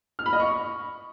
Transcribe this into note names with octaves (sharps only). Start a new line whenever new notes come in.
F6
B5
D#5
C#6